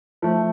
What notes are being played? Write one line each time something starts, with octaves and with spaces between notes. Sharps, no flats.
F3 A3